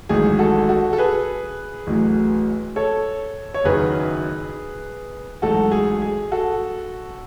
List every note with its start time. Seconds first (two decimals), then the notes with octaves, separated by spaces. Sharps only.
0.09 A1 G#2 D#3 F#3 G#4
0.39 F#4 A4
0.69 F#4 A4
0.93 A4
0.98 G#4 B4
1.87 A1 A2 F#3
2.76 A4 C#5
3.54 C#5
3.64 F#1 F#2 D#3 F#3 G#4 B4
5.42 A1 G#2 F#3 F#4 A4
5.72 G#4
6.02 G#4
6.32 F#4 A4